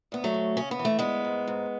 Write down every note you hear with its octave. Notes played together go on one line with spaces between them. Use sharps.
D2 B3
F#3 A3
D2
C#3 C#4
B3
E3
A3
D2 G#3 B3
G#2
G#2